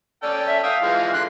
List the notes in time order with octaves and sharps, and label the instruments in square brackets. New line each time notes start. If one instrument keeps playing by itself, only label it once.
[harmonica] C#4 A4 G5 [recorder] D5
[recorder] E5
[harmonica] E5 G5 D#6 [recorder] F5
[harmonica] E3 F3 G#3
[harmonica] D3 C6 [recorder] F#6